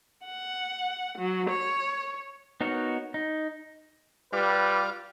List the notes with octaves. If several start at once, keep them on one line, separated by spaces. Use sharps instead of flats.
F#5
F#3
C#5
B3 D#4 F#4 A#4 C#5
D#4
G3 F4 B4 D6